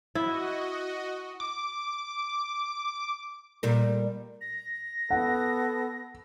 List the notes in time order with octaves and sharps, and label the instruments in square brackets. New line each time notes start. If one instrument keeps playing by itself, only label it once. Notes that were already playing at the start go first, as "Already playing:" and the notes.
[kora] E4 [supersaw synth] F#4 D#5
[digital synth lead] D6
[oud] A#2 G3 A#4
[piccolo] A#6
[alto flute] B3 [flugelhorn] A4 [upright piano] F#5